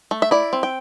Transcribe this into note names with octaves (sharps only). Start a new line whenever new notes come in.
A3
E5
E4 D5
C4
G5